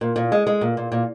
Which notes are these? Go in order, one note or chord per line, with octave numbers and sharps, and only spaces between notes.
A#2
A#2
G#3
G#3
A#2
A#2
A#2